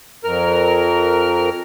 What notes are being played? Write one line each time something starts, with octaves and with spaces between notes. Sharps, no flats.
F2 A#4 F6